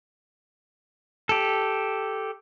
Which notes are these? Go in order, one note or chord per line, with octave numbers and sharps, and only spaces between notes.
G4 A4